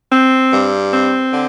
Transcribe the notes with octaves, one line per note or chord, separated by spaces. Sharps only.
C4
G2
C4
D3